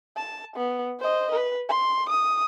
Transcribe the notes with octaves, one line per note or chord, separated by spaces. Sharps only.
A5
B3
C5 D#5
B4
C6
D#6